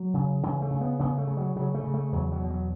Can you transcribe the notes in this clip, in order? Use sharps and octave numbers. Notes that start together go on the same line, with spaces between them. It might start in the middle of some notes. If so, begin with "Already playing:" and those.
Already playing: F#3
C#3
C#3 E3
A3
C#3
B3
C#3 B3
A3
C#3
F#3
C#3 F#3
A3
C#3
A3
E2 F#3
F#3
B2
F#3